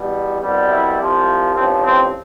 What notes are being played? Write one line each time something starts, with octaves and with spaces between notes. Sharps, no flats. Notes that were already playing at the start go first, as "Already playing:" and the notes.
Already playing: E2 B2 G3
C2 B2 G3
E4
C2 C3 F3
A1 G2 F3 C4
C4